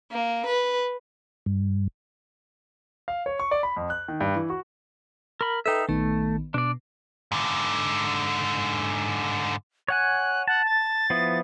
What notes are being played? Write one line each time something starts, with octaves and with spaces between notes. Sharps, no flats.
A#3
B4
G2
F5
C#5
C#6
D5
B5
F2
F#6
D#3
G2
E3
F#4
A#4 B5
D#4 A4 B4 E5 G5
A#1 D#3 A3 B3
B2 D4 D5
G#2 D3
C#5 F#5 G#5 F#6
F#5 A5
A6
F3 B3 E4